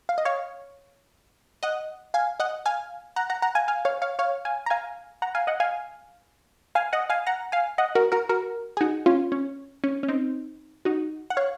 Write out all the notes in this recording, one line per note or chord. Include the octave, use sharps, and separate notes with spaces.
F5
D#5
C#5 F5
D#5 F#5
F5 G#5
D#5 F#5
F5 G#5
F#5 A#5
F#5 A#5
F#5 A#5
F5 G#5
F5 G#5
C#5 F5
C#5 F5
C#5 F5
F5 G#5
A#5
F5 G#5
F#5 A#5
F5 G#5
D#5 F#5
F5 G#5
F5 G#5
D#5 F#5
F5 G#5
F#5 A#5
F5 G#5
D#5 F#5
F#4 A#4
F#4 A#4
F#4 A#4
G#4
D#4 F#4
C#4 F4
C#4
C#4
C#4
C4 D#4
D#4 F#4
F#5
C#5 F5